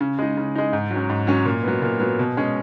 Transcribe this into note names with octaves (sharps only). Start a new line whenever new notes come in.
C#3
G#3 D#4
C#3
G#3 D#4
G#2
F#3
C#4
G#2
F#3 C#4
A#2
F#3 B3
A#2
F#3 B3
B2
G#3 C#4